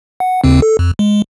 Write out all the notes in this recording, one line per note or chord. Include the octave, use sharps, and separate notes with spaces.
F#5
D#2 C#3 C4
A4
F2
G#3